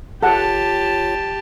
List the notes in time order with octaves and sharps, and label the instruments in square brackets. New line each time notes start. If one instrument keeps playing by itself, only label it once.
[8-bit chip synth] A1 F4 C#5 [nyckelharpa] G4 A5 [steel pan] A4 F#5